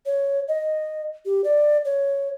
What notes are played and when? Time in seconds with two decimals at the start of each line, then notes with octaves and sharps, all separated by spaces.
0.06 C#5
0.48 D#5
1.26 G4
1.44 D5
1.85 C#5